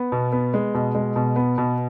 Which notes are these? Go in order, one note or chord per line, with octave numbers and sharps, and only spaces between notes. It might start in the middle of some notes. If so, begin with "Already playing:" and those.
Already playing: B3
B2
B3
G#3
B2
G#3
B2
B3
B2